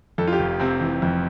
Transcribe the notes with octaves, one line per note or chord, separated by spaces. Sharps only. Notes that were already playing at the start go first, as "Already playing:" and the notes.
F2 A4
F4
G4
F1
C3 C4
E3
F2